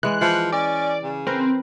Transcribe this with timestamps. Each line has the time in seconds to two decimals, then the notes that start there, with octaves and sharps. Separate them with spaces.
0.03 E3 G#3 G#4 F#6
0.21 E3 F3
0.52 C#4 D5
1.03 C#3
1.27 C4 A#4 B4